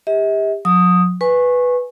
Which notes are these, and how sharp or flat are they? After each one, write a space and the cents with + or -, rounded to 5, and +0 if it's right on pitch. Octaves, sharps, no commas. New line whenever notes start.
G4 +30 E5 -45
F#3 -45 D#6 +0
B4 +0 G#5 +0 C#6 -20